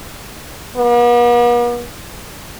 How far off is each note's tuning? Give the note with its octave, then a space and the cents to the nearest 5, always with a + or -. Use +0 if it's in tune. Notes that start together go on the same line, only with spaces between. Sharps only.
B3 -45